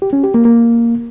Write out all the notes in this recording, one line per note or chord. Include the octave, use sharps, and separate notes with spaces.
G4
C#4
G4
A#3
A#3